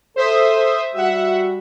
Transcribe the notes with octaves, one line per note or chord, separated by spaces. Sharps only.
A4 C5 E5 D#6
G3 F#4 E5 F#5